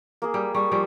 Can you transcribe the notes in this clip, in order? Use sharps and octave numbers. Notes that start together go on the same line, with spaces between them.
A#3 G#4
G3
G3 G4 G#4 C#6
F3 G3